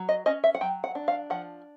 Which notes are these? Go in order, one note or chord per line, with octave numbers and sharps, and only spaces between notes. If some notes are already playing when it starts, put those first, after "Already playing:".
Already playing: F#3
D#5
C#4 D#5
E5
F#5
F#3 G5
F#5
D4
F5
F3 F#5